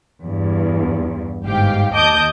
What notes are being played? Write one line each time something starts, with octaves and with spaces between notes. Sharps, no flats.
E2 G2
G1 G#2 G4 F5 G5
D#2 D#5 A5 D6 D#6 G6